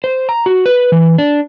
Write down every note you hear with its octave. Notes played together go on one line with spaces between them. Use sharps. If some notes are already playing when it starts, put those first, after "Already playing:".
C5
A#5
F#4
B4
E3
D4